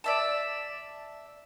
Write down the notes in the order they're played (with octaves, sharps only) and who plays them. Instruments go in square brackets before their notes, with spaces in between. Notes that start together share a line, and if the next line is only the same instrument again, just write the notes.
[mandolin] D5 E5 A5